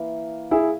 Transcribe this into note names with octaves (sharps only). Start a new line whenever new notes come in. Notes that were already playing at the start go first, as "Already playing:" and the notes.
Already playing: E3 A#3
E4 G#4